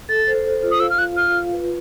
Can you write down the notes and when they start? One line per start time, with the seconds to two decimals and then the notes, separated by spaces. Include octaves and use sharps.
0.09 A4 A6
0.27 C5
0.45 C5
0.63 F4
0.71 D#6
0.80 F5 E6
0.90 F6
0.98 F4 F#6
1.17 F5 F6
1.35 F4
1.52 B4